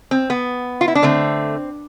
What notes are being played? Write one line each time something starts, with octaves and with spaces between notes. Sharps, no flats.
C4
B3
F4
E4
D4
D3 A3 C4